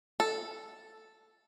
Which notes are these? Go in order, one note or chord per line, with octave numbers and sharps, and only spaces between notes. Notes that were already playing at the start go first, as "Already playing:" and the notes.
A4